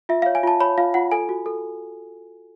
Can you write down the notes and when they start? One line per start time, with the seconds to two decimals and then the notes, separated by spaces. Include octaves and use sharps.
0.09 F4 E5
0.22 F5
0.26 C#5
0.35 G#5
0.43 F4 A5
0.60 C#5 B5
0.78 F4 F5
0.94 F4 F#5
1.11 A4 G#5
1.29 F#4
1.46 A4